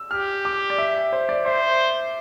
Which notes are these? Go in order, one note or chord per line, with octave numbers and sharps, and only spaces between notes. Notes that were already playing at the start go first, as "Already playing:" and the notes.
Already playing: E6
G4 F6
D6
D5
E5
C5
D5
C5 E5